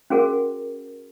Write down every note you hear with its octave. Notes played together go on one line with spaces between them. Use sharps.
C#4 F#4 G#4 A#4 F#5